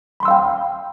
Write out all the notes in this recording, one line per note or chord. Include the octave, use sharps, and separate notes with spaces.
F5 G5 B5 C6 E6